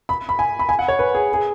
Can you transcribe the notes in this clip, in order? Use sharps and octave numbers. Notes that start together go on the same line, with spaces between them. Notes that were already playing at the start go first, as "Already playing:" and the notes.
B5
B5
G#5
B5
G#5
F#5
C#5
B4
G#4
G#4